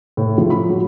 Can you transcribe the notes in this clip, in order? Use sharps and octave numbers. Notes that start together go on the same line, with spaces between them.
A2
F3
B5
F#3